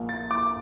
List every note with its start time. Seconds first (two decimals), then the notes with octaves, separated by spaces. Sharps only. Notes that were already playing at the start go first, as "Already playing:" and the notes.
Already playing: A#1 A#2
0.09 A6
0.31 D6